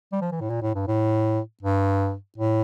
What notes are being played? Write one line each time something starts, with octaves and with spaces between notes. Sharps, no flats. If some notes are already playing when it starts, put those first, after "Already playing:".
G3
F3
E3
A2
A#2
A2
G2
A2
G2
A2